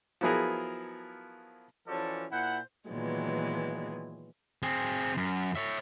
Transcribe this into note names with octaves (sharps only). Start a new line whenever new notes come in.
F3 F#3 B3 E4 G#4 A#4
E3 F3 C#4 F#4 A4 D5
A#2 E4 C5 F#5
A#2 D#3 E3 F#3 G#3 B3
C4 G#4
F#2
C#5 E5